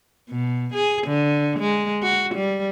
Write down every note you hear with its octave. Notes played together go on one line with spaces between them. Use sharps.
B2
G#4
D3
G#3
F#4
G3